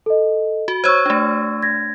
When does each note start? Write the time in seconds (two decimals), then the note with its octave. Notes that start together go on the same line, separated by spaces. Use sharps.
0.06 A4 D#5
0.68 F#4
0.84 C5 C#5 C#6 E6 G#6
1.06 A3 D4
1.63 G#6 A#6